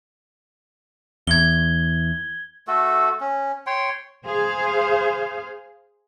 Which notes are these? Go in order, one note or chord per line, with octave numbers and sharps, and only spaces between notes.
E2 G#6 G7
A3 F#4 A4
C#4
C#5 G5 C6
G#4 C5 F5